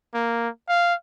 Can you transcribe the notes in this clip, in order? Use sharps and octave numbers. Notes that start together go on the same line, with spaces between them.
A#3
F5